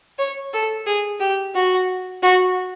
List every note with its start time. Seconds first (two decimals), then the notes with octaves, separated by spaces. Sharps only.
0.18 C#5
0.53 A4
0.86 G#4
1.20 G4
1.54 F#4
2.22 F#4